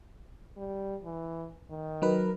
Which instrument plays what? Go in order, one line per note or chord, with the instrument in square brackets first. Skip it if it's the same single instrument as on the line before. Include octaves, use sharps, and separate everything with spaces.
[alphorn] G3
E3
D#3
[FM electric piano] F#3 D#4 B4 [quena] A#4